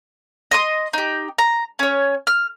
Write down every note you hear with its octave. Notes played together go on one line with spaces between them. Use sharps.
D#5 C6 D#6
D#4 G4
A#5
C#4 C#5
F6